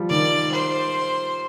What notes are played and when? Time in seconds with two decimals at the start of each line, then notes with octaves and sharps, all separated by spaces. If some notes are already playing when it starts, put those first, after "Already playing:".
Already playing: F3 G3
0.10 D#3 D5
0.52 C5